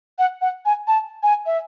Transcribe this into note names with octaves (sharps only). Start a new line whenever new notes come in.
F#5
F#5
G#5
A5
G#5
E5